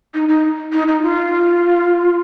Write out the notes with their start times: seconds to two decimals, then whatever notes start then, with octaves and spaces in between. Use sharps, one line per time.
0.14 D#4
0.29 D#4
0.73 D#4
0.88 D#4
1.02 F4